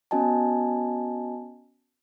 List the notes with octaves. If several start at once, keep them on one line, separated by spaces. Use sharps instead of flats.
B3 C#4 F#4 D#5 G#5 A5